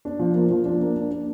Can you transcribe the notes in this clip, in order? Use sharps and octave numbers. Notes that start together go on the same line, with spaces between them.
D4
F3
A#3
F3
D4
A#3
D4
D4